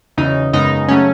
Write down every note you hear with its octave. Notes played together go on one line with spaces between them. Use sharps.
E2 C#3 F#3 D#4
F#2 C#3 G#3 B3 D#4
C#3 F#3 A3 C#4